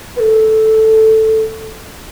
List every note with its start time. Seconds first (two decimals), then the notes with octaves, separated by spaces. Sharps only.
0.17 B4
0.20 A4